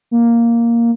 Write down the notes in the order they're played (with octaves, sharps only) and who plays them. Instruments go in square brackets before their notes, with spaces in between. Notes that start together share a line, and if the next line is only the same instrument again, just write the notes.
[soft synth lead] A#3